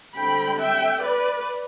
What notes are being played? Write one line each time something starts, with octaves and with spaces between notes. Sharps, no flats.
D3 G3 C4 G5 B5
E5 G5
B4 D5